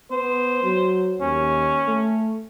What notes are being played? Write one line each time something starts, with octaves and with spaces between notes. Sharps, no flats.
B3 C5
F#3
D#2 C#4
A3